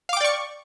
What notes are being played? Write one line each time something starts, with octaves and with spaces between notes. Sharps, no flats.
D5 F5 G5 C#6 D6